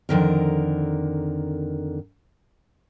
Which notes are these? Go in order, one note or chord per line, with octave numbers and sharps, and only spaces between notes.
F2 D3 D#3 A#4